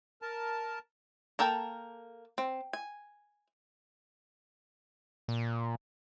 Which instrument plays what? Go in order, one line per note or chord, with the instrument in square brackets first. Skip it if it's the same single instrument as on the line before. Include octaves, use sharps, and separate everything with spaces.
[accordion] A#4 A5
[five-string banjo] A#3 A4 A#4 G5 A5
C4
G#5
[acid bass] A#2